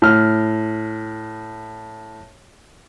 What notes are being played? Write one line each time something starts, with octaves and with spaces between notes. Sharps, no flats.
A2 F6